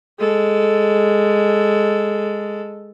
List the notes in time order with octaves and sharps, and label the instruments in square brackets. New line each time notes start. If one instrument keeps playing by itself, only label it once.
[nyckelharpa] G#3 A4